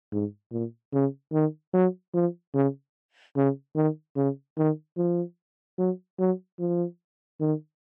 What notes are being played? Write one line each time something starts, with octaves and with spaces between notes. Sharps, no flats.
G#2
A#2
C#3
D#3
F#3
F3
C#3
C#3
D#3
C#3
D#3
F3
F#3
F#3
F3
D#3